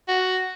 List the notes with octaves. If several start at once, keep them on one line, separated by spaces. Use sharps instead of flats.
F#4